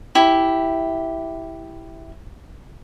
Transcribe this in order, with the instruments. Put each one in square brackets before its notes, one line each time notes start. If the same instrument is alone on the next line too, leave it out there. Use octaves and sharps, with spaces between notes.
[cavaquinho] E4 G4